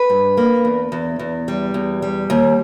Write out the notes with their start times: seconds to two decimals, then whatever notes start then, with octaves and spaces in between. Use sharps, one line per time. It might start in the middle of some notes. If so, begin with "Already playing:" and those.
Already playing: B4
0.10 G2
0.37 A#3
0.65 E2
0.92 E2
1.19 E2
1.48 G3
1.74 E2
2.02 G3
2.30 D#2